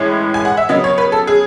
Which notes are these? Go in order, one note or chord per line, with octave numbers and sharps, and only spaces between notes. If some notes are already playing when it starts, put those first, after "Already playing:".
Already playing: A2 E3 G#3 C#4
G#5
F#5
E5
C#3 F#3 B3 D#5
C#5
B4
A4
G#4